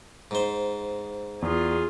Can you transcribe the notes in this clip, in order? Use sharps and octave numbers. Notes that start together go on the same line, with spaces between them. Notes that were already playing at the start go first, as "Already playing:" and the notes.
G#2 C5
E2 F4 G#4